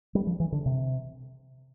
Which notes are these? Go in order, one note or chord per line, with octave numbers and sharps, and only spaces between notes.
G3
F3
E3
D3
C3